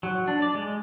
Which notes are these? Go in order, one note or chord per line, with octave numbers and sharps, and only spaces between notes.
F#3
D4
D5
G#3